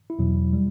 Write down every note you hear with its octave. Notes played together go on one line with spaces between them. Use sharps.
E4
E2 B2 F#3
G3